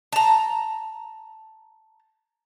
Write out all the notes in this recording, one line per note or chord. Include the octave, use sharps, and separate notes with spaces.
A5 A#5